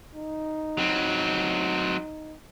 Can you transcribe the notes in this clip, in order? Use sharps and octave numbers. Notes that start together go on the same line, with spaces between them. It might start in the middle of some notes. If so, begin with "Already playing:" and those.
D#4
F#3 C4